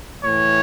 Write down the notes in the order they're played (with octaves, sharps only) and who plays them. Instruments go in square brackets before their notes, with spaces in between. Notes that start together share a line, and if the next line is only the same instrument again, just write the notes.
[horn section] A2 E3 C#5